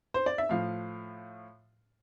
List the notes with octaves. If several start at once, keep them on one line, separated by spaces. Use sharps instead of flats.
C5
D5
E5
A2 F3 F5